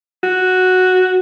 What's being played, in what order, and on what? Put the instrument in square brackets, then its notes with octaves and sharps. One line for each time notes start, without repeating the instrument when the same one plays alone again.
[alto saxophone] F#4